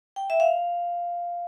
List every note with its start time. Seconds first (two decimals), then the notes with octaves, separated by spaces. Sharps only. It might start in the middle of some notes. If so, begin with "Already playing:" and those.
0.16 G5
0.30 E5
0.40 F5